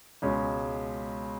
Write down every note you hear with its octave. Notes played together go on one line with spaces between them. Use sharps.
C#2 B2 G#3 C#4